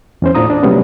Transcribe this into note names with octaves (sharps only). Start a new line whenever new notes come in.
E2 C#4 C5
A2 D4 F4 A#5 D#6
D4
C3 F#3 G3 A3 B3 C#4